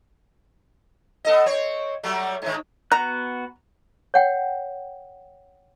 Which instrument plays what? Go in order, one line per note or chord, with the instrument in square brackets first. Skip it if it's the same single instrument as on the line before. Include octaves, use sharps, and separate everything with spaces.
[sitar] B3 A4 D#5
C4 C#5
F#3 G3 A3
G#2 D#3
[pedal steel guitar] B3 F#4 F#6 [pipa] A#5
[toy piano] C#5 F#5 G5